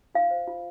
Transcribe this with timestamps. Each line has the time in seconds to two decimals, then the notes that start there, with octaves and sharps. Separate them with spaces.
0.15 F4 F5
0.31 C5
0.47 F4